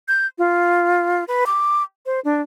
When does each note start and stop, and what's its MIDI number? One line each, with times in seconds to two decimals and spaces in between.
0.08 0.27 91
0.38 1.24 65
1.28 1.44 71
1.46 1.83 86
2.06 2.20 72
2.25 2.41 62